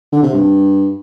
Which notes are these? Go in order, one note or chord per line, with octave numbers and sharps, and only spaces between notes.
D3
C3
G2